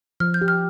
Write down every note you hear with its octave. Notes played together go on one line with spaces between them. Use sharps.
F3 F6
G6
G4
F6